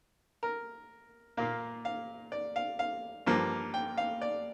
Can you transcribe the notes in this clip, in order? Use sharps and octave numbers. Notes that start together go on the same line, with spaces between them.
A#4
A#2 A#3 F5
F5
D5
F5
F5
G2 F3 A#3
G5
F5
D5